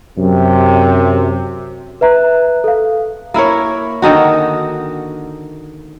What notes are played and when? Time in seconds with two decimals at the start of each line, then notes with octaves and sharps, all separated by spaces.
0.18 F#2 C3
2.01 B4 E5 A#5 F#6
2.64 A4 F5
3.34 A#3 E4 A#4 C#5
4.02 D3 D#3 D#4 F#4